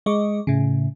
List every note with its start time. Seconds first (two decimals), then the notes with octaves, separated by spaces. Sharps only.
0.06 G#3 D#5 C#6 D6
0.47 A2 C#3